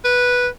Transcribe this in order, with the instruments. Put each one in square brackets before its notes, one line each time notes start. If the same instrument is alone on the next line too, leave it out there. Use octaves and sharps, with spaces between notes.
[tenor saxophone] B4